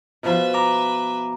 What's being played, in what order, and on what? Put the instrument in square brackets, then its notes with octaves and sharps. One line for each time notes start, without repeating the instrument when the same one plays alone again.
[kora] B2 F3 [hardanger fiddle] B4 E5
[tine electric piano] A#5 D6